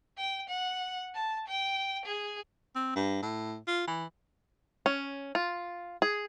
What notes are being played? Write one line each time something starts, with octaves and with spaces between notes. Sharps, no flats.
G5
F#5
A5
G5
G#4
C4
G2
A2
F4
E3
C#4
F4
G#4